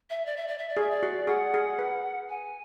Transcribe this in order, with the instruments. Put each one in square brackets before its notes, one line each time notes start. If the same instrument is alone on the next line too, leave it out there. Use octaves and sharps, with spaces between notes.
[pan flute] E5
D5
E5
D5
E5
D5
[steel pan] G#4 [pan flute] E5
[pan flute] D5
[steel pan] F#4
[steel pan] G#4 [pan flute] F#5
[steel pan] G#4
B4
[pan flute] G#5